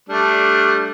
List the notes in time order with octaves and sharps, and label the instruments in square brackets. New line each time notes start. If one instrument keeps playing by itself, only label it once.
[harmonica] G3 A3 D4